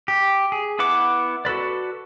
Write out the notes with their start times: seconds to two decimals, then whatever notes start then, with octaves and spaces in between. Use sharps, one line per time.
0.08 G4
0.52 G#4
0.79 B3 E4 B4 F#5 D6
1.45 F#4 A4 B4 D5